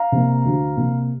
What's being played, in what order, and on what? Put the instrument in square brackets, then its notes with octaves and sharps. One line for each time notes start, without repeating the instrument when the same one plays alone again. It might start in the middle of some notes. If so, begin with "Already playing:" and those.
Already playing: [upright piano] F5 A#5
C3 A#3
D2
C3 A#3